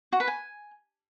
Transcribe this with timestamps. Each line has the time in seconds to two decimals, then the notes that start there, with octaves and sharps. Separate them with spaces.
0.13 F#4
0.20 B4
0.28 G#5